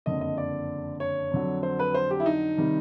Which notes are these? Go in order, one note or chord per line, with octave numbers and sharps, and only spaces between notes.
F#1 F2 D3 D#5
D#5
D5
C#5
F2 D3 F#3
C5
B4
C5
G4
E4
D#4
C3 D#3 G3